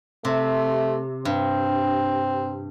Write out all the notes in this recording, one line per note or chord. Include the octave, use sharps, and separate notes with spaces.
C3 A3
G2 C4